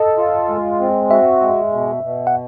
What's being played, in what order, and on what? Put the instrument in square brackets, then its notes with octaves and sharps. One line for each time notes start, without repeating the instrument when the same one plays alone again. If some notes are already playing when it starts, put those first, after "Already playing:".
Already playing: [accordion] A4 [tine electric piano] D#5
[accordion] F4
G#3
C4
[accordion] F#4 [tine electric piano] E5
[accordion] G#3
B2
B2
[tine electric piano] F#5